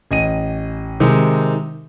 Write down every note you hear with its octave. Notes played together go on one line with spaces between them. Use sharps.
A1 D#5 D#7
C3 D#3 G#3 D#4